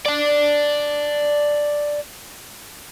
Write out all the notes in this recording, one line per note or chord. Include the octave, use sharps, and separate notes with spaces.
D5 A5